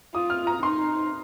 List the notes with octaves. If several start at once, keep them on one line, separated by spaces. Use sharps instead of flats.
F4 D#6
F6
A#5
D#4 C6